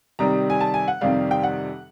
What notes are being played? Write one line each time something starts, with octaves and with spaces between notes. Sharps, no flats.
C3 D#3 G3 A#5
G#5
A5
G#5
F#5
F2 C3 D#3 G3 F5
G5
F#5